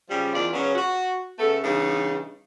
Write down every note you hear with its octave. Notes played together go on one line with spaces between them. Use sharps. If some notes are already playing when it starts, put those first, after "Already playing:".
C#3 F3 G3
E2 D#3 F4 D5
C#3 F#3 B3 C#4
F#4
C#3 A3 B3 A4
G2 C#3 E3 B3 D#4